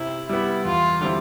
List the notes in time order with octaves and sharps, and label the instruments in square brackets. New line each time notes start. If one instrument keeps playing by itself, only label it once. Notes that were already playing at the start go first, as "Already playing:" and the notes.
Already playing: [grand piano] C3 [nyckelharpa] E4
[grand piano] G3 B3 [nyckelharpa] E4
[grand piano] E2 [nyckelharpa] F4
[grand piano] D3 G3 C4 E4